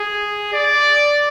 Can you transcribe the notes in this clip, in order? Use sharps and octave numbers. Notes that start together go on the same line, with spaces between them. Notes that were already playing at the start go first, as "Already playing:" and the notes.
Already playing: G#4
D5